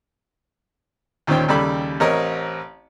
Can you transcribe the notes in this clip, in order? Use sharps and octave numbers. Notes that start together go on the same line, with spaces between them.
D#2 A#2 D#3 C#4 C5 G5
D#2 C#3 G3 A4 D5 B5
A1 C4 A#4 C#5 D#5